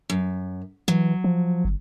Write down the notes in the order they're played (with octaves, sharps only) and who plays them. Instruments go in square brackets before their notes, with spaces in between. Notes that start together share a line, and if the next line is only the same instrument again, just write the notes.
[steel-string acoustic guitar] F#2
[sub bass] E3 [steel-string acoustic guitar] F#3
[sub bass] F3
G1